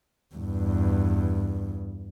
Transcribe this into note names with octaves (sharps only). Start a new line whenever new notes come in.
E2 G2